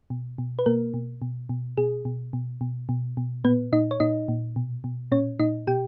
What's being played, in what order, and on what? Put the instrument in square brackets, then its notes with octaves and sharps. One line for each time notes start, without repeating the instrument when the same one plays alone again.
[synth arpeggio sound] B2
B2
B4
B2 A#3 A#4
B2
B2
B2
B2 G#4
B2
B2
B2
B2
B2
A#2 B3 B4
A#2 D#4 D#5
C#5
A#2 D#4 D#5
A#2
B2
B2
A#2 C#4 C#5
A#2 D#4 D#5
B2 G4 G5